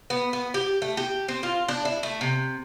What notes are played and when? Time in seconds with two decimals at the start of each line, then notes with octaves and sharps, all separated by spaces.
0.10 B3
0.33 B3
0.54 G4
0.82 A3
0.97 G4
1.28 C4
1.43 F4
1.68 D4
1.85 E4
2.03 A3
2.21 C3